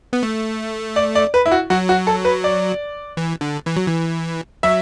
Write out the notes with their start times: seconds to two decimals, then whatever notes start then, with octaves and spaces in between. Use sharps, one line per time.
0.13 B3
0.23 A3
0.96 D5
1.15 D5
1.34 B4
1.46 E4
1.52 F#4
1.70 F#3 F#4
1.89 F#4
2.07 A4
2.25 B4
2.44 D5
3.17 E3
3.41 D3
3.66 E3
3.76 F#3
3.87 E3
4.63 F#3 E5